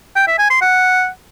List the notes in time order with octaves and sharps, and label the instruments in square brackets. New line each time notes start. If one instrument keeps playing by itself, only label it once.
[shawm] G5
E5
G#5
C6
F#5